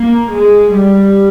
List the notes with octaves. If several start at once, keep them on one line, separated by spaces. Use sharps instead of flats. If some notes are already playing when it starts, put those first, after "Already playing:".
Already playing: A#3
G#3
G3